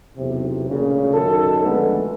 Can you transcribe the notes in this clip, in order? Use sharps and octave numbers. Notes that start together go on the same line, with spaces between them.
B1 E2 C3
D2 A#2 C#3
F#2 D#3 A4
F2 D3 G#3 A3 B3